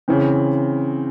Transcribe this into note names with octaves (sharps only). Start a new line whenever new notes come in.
C#3 E3 C4